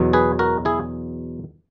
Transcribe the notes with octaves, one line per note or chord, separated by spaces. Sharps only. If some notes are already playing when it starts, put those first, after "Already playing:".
Already playing: E2 B2 F#3
G#4 B4
F#4 A#4
E4 G#4